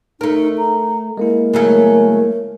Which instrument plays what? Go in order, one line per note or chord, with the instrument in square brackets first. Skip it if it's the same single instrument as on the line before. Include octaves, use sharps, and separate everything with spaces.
[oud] A3 A#4 [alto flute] D#4
[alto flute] A#5
[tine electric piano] G#3 A#3 E4 [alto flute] A#4
[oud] C#3 F#3 A3